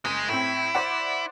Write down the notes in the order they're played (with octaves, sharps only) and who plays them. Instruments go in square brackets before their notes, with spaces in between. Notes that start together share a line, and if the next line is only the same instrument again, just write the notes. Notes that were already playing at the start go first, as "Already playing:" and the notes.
[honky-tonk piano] F#1 [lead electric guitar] G#3
[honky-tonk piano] A2 C4 [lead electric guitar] E4
[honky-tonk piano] C5 D5 F#5